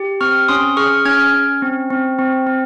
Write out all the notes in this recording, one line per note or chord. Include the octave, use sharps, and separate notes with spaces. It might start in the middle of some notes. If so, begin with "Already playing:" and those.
Already playing: G4
C4 C#6 F6
C#4 C6 D#6
G#4 C#6 F6
C#4 F6 G#6
C#4
C4
C4
C4
C4